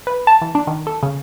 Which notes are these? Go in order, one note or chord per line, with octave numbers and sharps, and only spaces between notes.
B4
A5
E3
D4
D#3
A4
C#3